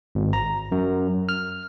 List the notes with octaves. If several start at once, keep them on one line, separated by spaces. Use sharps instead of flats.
G#1
A#5
F#2
F6